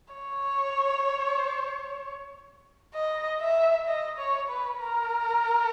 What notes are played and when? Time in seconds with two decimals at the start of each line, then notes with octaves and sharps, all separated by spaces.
0.14 C#5
2.94 D#5
3.41 E5
3.87 D#5
4.18 C#5
4.49 B4
4.80 A#4